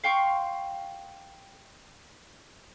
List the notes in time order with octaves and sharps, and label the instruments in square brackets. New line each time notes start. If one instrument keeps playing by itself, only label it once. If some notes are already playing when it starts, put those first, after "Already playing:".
[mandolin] F5 G5 C6 C#6